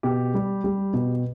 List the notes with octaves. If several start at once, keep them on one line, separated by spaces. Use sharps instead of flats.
B2 G4
G3
G3
B2